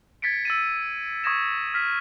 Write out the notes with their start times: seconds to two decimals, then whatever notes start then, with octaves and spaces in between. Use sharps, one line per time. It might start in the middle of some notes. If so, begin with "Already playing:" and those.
0.22 G#6 A6 B6 C#7 D7
0.45 E6 A6 D#7
1.24 C#6 D#6 G#6 A#6 E7
1.74 F6 B6